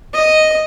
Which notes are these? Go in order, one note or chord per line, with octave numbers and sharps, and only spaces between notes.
D#5